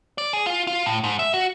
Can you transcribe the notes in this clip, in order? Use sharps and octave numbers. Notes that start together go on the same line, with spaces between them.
D5
G#4
F4
F4
A2
G#2
E5
F#4